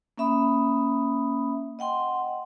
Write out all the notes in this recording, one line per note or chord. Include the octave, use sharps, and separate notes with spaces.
A#3 C#4 E5 B5 D#6
D#5 F#5 G5 C6